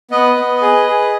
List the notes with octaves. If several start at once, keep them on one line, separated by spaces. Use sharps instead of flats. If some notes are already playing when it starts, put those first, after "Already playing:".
B3 B4 D#5
B3
G#4
G#4